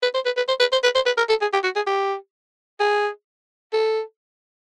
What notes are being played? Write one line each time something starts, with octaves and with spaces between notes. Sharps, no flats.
B4
C5
B4
B4
C5
B4
C5
B4
C5
B4
A#4
A4
G#4
G4
F#4
G#4
G4
G#4
A4